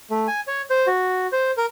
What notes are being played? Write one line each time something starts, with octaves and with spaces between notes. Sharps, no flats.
A3
G#5
C#5
C5
F#4
C5
A#4